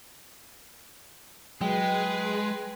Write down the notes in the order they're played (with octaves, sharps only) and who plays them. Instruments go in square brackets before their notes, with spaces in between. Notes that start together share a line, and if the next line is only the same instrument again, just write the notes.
[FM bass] F#3 [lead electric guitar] G#3 [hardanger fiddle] G#4 B4 [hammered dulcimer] G5